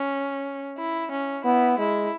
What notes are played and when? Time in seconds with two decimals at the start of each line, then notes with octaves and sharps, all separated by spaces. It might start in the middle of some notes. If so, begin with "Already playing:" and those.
Already playing: C#4
0.77 E4
1.11 C#4
1.45 B3 E4
1.78 G#3 E4